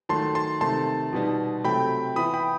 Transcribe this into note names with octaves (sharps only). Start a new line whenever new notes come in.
D#3 F#3 A3 A5 C6
A5 C6
C3 D#3 A3 A5 C6
B2 G3 B3 D#4
C3 F#3 A3 G5 B5
E3 B3 E4 B5 D#6
G5 B5